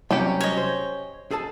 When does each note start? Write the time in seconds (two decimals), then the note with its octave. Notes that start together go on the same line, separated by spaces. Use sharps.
0.11 C2 F#3 C4 C#4 G4
0.41 C#5 D#5
0.57 C5
1.31 G#4 A4 A5